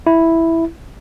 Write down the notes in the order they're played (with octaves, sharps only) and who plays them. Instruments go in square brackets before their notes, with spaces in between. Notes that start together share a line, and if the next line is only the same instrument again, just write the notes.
[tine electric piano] E4